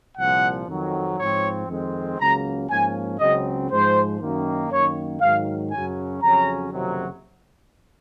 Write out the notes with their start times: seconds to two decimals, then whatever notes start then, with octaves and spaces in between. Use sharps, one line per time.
0.17 C2 A#2 F3 F#5
0.68 F2 D#3 F#3
1.18 G#2 F3 C4 C#5
1.68 F2 D#3 G#3 C4
2.19 C#2 C#3 F#3 A#3 A#5
2.69 G#2 F3 A#3 C#4 G#5
3.19 C#2 C#3 F#3 C4 D#5
3.70 G#2 F3 G#3 C5
4.20 F#2 D#3 A#3
4.71 F#2 D#3 A#3 C#5
5.20 G#2 D#3 F#3 F5
5.71 F#2 C#3 F#3 C#4 G#5
6.21 F2 C#3 F#3 C#4 A#5
6.72 F#1 F2 C3 D#3 F#3